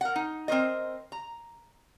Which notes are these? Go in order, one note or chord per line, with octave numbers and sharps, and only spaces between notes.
A#4 F#5
D#4
C4 A#4 C5 D#5
A#5